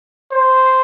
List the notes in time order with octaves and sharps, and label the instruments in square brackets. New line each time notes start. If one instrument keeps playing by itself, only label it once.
[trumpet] C5